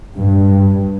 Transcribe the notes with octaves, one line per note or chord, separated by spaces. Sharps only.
G2